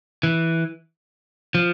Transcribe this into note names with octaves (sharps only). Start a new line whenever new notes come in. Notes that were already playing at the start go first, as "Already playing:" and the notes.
E3
F3